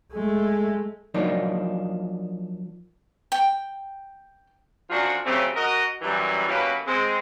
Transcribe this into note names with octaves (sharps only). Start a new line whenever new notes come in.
G#3 A3
F3 F#3 A#3 D4 D#4 F4
G5
F#2 F3 D4 F4 F#4
C#3 F#3 A3 C4 C#4 G4
F#4 A#4 D#5
F#2 E3 G3
F#2 B2 A#3 C#4 G4 B4
G#3 C4